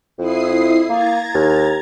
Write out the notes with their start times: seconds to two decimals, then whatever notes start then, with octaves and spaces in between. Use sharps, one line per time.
0.19 F2 E4 D#6 C7
0.90 A#3 A#5 G#6 A6
1.35 D#2